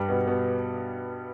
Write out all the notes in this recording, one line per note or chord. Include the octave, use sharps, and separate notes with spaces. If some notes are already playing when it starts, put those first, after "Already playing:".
Already playing: G2 G3
B2 B3
B2 B3